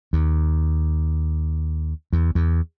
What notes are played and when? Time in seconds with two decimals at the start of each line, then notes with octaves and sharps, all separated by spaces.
0.13 D#2
2.13 E2
2.35 E2